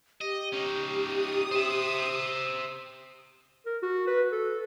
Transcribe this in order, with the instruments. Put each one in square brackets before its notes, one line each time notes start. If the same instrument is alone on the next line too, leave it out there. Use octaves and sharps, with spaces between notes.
[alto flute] G4 [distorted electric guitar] D#5
[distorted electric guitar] C#4 D#4
[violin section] D#6
[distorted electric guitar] C5 E5
[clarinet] A#4
F#4
B4
A4